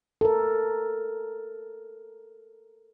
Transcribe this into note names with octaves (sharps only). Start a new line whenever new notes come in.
A4 A#4